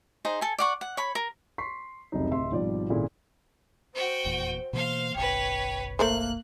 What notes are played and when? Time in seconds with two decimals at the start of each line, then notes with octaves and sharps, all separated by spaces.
0.25 D#4 G#4 C5
0.41 A4 G#5
0.58 D5 F#5 C#6
0.81 F#5
0.97 C#5 B5
1.15 A#4
1.58 C6 C#6 B6 C7
2.12 F1 C#2 F#3 D#4
2.31 D1 C3 D#5 E5 C6
2.51 G#1 B2 D#3 F3 G3 D5
2.90 G#1 A#2 C#3 E4 G#4 A4
3.95 F#4 C5 G5
4.25 F1 E2 A#2
4.73 B2 E3 A#3 C5 F5
5.15 F#1 B1 B4 C#5 G5
5.99 A3 A#3 A#4 C5 F#6